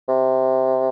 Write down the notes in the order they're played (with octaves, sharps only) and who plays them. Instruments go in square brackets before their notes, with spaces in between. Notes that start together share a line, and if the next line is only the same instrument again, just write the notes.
[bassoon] C3